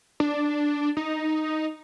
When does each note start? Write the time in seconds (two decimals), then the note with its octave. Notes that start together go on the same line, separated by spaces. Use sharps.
0.20 D4
0.97 D#4